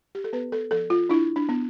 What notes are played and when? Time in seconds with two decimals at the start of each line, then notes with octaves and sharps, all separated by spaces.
0.15 G4
0.24 A4
0.33 B3 B4
0.52 A4
0.71 F3 A4
0.90 F4
1.09 D4 E4
1.36 D4
1.49 B3